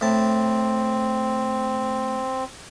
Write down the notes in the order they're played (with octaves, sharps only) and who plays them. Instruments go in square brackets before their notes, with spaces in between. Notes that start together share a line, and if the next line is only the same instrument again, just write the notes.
[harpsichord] A2 A5 [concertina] C4